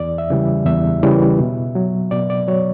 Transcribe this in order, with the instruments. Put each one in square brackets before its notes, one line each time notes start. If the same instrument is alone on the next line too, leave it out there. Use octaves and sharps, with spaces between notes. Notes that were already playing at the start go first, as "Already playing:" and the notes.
Already playing: [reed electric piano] E2 D5
E5
C#3 E3 G3
E2 E5
C#3 E3 G3
B2
F#3
B2 D5
D5
F#3 C#5